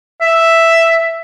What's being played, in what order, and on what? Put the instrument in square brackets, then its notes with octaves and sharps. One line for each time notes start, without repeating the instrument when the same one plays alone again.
[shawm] E5